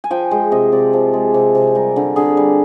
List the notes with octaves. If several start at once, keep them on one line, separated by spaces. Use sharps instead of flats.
G#5
F3 G5
G#3 G5
C3 D#5
C3 D5
F3
G#3
C3
C3
G3 A#4
D3
D3 G#4
G3